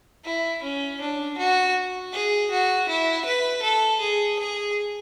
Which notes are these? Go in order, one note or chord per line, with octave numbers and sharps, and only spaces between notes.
E4
C#4
D4
F#4
G#4
F#4
E4
B4
A4
G#4
G#4